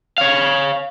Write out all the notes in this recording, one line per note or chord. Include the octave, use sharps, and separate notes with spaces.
C#5 F5